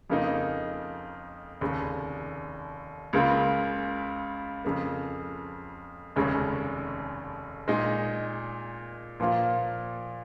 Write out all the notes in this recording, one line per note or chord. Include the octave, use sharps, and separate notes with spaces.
F2 C#3 A#3 D#4
F1 D#2 C#3
C#2 C#3 A#3 F4
F2 C#3 A#3
F1 D#2 C#3 G#3 C#4
A#2 G#3 D#4
A#2 F3 A#3 F4